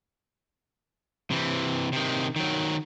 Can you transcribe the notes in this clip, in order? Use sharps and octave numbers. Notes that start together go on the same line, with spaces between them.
C3 E3
C3 D#3
D#3 F#3